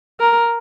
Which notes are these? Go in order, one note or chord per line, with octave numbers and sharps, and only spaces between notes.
A#4